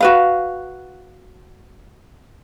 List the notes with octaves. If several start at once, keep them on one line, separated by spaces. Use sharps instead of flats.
F#4 B4 F5